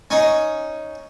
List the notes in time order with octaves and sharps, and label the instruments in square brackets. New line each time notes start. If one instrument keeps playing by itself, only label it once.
[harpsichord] C#4 D#4